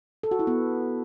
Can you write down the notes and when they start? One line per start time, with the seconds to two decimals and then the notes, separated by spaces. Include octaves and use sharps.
0.23 A4
0.31 F#4
0.39 E4
0.47 B3